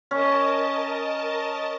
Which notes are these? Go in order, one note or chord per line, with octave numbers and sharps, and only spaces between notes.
C#4 A#4 D#5 A5